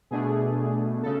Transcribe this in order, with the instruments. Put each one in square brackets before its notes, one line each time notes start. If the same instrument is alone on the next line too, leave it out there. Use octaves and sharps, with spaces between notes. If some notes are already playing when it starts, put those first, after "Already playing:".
[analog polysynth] B2 A3 D4 G#4
C#3 A4